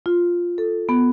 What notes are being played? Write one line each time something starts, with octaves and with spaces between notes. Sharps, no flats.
F4
A4
B3